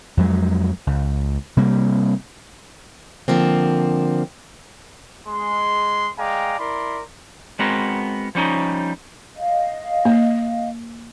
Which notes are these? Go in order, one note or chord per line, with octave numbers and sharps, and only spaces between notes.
F2 F#3 G#3
C#2
C3 G3 A#3
D3 F3 A#3 C4
G#3 C6
G#3 D5 F5 G5 G#5 A#5
E4 A#4 D5 B5 C6
G#3 B3 C4 F#4 A#4
F3 G3 C#4 D#4
D#5 F5
A#3